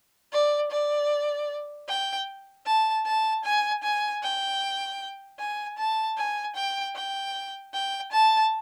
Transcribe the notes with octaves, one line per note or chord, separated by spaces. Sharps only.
D5
D5
G5
A5
A5
G#5
G#5
G5
G#5
A5
G#5
G5
G5
G5
A5